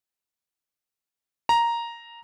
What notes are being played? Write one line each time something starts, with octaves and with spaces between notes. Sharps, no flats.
A#5